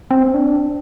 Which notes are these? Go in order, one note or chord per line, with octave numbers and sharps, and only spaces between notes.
C4
D4